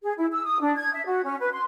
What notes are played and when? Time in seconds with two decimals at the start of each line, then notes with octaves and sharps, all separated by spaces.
0.03 G#4
0.17 E4
0.32 E6
0.45 D#6
0.61 D4
0.77 G#6
0.93 E5
1.06 F#4
1.24 C#4
1.40 B4
1.52 C6